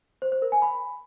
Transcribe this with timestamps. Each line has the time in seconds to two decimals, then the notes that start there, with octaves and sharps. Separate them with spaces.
0.22 C5
0.32 C5
0.42 A#4
0.52 G#5
0.62 B5